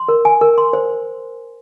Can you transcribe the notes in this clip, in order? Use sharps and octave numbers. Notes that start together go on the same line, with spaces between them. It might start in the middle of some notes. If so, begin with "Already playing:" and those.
Already playing: C6
A#4
G#5
A#4
C6
C5